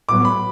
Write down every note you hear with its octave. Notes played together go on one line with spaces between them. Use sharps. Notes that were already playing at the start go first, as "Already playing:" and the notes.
A2 F#3 B3 D6
B5